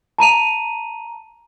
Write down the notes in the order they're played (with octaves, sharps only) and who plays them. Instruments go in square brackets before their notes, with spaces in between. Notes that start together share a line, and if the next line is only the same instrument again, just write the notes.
[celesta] A5 A#5 D#7 F7